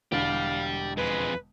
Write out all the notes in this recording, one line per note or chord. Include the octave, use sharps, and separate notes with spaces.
E1 D3 G4 D5 F5 B5
F2 G#3 B4